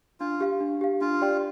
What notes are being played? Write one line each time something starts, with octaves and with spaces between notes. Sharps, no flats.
D4 F4
G4 F5
D4
G4 F5
D4 F4
G4 D5 G5 C6